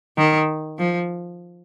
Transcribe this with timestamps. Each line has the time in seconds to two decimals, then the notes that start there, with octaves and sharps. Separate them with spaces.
0.18 D#3
0.78 F3